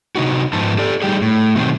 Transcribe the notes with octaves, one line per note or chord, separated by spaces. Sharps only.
C3 D#4 F#4
G#2 F3 B3 A5
G4 A4 D5
G3 D#4 G4 G#4
A2
B2 D#3 F#3 C4